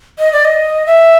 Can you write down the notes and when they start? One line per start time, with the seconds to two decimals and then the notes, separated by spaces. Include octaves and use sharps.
0.19 D#5
0.33 D5
0.45 D#5
0.86 E5